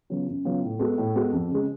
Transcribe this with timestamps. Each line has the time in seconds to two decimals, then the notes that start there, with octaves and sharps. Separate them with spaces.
0.10 C#3 F#3 B3 F4
0.28 F#2
0.45 C#3 F#3 B3 F4
0.63 A2
0.79 G#3 B3 F#4 A4
0.98 A2
1.15 G#3 B3 F#4 A4
1.32 F2
1.51 C#3 G#3